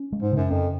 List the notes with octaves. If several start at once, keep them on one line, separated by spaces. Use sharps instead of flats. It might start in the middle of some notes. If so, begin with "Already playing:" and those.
Already playing: C#4
G#3
G#2
F#2 C#3
F2 C#4